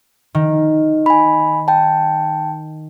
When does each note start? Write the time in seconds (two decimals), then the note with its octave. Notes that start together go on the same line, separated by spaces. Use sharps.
0.35 D#3
1.06 G#5 B5
1.68 G5 A5